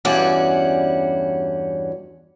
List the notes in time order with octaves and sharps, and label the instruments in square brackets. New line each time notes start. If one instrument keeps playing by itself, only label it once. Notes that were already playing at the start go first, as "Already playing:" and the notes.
[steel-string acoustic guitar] E2 G2 C#4 F#4 D5